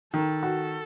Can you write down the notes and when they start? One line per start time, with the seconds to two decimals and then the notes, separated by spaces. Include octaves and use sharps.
0.13 D#3 A4
0.43 F#4